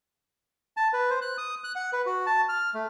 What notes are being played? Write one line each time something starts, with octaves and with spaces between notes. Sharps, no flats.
A5
B4
C5
F#6
D#6
F#6
F#5
B4
F#4
A5
F6
A3